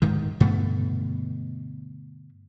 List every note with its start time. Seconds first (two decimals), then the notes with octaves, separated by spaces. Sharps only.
0.02 D1 G#2 D#3
0.40 G2 B2 D3 A3